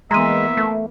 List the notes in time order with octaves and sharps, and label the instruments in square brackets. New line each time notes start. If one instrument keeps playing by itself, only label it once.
[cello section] E3 A#3 B3 [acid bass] G#3 [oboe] E5 [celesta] A#5 C6 D#7
[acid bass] A3